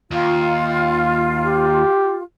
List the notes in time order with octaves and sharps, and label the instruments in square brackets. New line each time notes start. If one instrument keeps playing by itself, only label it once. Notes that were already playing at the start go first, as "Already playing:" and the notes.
[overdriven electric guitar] D#2 [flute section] F4
[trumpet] G4